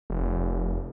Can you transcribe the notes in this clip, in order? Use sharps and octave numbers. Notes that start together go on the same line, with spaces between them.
F1